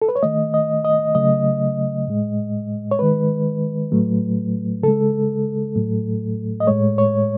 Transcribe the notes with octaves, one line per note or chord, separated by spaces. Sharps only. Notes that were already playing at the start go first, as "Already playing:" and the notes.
A4
B4
C#5
D#3 A3 D#5
D#5
D#5
C#3 F#3 A3 D#5
A2 G#3
C#5
D#3 G#3 B4
A2 F#3 A3
C#3 G#3 A4
A2 F#3 A3
D#5
A2 G#3 C#5
C#5